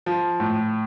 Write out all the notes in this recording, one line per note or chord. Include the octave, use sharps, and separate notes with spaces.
F3
A2